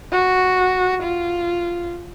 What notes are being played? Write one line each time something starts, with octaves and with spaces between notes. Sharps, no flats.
F#4
F4